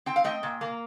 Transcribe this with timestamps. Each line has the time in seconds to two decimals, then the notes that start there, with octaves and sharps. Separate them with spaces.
0.06 C4 G5
0.16 F5
0.24 A3 D#5 G5
0.43 A#2
0.61 A#3